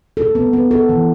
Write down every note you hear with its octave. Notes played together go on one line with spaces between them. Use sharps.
A4
B3
B3
A4
E3